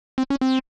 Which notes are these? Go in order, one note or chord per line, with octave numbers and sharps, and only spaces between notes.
C4
C#4
C4